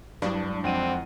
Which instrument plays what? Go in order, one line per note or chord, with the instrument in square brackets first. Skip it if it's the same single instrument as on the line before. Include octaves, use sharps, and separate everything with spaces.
[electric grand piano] G2 [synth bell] F#3 G#3 E4 [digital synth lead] D4
[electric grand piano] F2 F#5 D#7 [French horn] C4